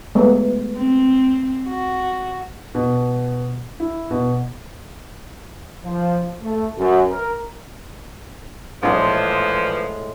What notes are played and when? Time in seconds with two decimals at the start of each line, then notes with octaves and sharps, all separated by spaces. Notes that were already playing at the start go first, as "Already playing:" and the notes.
0.15 G#3 A3 B3
0.77 C4
1.67 F#4
2.75 B2
3.80 E4
4.11 B2
5.83 F3
6.42 A3
6.78 F#2
7.11 A#4
8.83 A#1 A2 E3 F3 G#3 D6